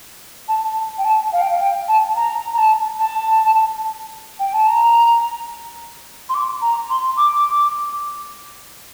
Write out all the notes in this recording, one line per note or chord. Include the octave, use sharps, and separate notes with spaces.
A5
G5
A5
F5
G5
F5
G5
A5
A#5
A#5
A5
A5
G5
A5
A#5
C6
D6
A#5
C6
D6